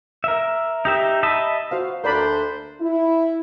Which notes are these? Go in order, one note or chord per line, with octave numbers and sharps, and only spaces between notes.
A#4 E5
D#4 G4 E5
D#5 E5 A5 B5
F#4 C5 F5
D2 D4 A#4 C5 D5 B5
E4